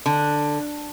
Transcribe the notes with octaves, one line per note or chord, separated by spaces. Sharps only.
D3